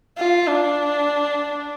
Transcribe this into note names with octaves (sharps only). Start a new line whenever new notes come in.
F4
D4